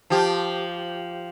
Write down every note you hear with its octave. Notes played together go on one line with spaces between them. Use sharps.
F3 G4